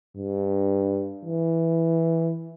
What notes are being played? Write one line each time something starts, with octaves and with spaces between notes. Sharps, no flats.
G2
E3